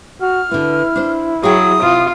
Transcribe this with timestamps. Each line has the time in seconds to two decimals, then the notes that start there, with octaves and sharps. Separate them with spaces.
0.21 F#4 F6
0.51 D3 B3 E4
0.96 D4 C5
1.44 F#3 G#4 F5 G5 D#6
1.82 C3 F4